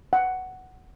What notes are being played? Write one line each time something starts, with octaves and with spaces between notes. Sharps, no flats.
F#5